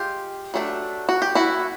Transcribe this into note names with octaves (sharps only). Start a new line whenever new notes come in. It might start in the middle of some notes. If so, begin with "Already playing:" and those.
Already playing: G#3 F4 G4
F#3 A3 D4
F#4
G4
E4 F#4